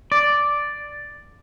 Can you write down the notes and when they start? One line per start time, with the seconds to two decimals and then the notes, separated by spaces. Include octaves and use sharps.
0.12 D5